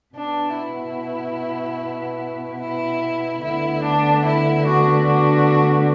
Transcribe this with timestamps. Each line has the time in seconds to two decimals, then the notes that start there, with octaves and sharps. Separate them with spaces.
0.15 B2 B3 D4
0.56 E4
2.61 E4
3.42 D2 D3 B3 E4
3.83 D4
4.24 E4
4.65 D4 F#4
5.06 D4 F#4